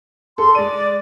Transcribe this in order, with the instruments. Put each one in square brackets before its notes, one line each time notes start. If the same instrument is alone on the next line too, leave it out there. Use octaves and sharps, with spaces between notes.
[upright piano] G#4 A4 [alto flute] C6
[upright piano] G#3 D#7 [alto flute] D5